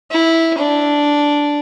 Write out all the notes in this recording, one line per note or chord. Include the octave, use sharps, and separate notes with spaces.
E4
D4